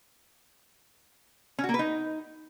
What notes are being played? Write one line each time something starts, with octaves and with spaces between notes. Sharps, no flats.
C#4
F#4
A#3
B4
D#4